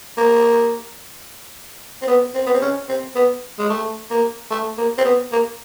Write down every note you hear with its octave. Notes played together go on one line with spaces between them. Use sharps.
A#3
C4
B3
C4
B3
C4
C#4
C4
B3
G#3
A3
A#3
A3
A#3
C4
B3
A#3